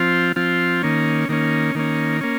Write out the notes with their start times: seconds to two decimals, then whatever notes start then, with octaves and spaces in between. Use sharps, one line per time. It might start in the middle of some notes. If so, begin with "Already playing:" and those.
Already playing: F3 C4 F4
0.36 F3 C4 F4
0.83 D#3 A#3 C#4
1.29 D#3 A#3 C#4
1.75 D#3 A#3 C#4
2.21 A#3 C#4